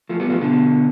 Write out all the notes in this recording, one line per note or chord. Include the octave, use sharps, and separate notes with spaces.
F3 A3
G3 B3
F3 A3
B2 D3